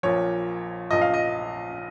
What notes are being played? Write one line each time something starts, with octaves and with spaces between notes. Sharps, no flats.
A#1 A#2 F3 C#5
A#1 A#2 F3 D#5
F5
D#5